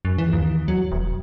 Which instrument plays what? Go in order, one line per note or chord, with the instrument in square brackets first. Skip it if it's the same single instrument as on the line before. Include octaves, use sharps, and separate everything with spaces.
[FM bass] F#2
E3
D#2
F#3
E1